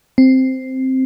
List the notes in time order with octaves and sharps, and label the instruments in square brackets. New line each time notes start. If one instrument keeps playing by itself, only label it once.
[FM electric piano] C4